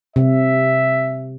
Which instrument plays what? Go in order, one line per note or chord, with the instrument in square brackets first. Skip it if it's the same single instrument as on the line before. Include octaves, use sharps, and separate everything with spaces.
[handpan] C3 [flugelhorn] E5